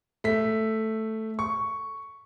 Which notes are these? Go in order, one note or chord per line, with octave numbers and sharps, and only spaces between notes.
A3 B6
C#6